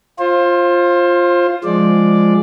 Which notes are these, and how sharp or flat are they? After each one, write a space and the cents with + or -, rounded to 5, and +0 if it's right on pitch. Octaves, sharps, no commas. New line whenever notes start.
F4 +0 C5 +25
F3 +0 G#3 +0 D5 +0